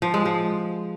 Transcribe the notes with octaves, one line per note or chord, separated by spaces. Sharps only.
F3
G#3
F3